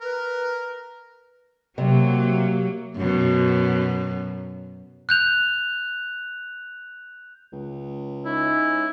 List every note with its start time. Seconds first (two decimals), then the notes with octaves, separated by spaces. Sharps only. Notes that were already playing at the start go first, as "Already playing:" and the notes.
0.01 A#4 B4
1.78 C3 F#3 A#3
2.97 F#2 B2
5.09 F#6 G6 F7
7.52 C#2
8.25 C#4 D#4 E4